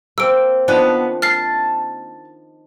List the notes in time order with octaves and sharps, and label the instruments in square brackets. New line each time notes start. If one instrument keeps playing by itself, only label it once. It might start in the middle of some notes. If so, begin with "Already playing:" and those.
[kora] A#3 C4 [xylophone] E6 D7
[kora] D#3 F3 D4 [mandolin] B3 B4
[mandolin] A5 [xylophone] F6 C7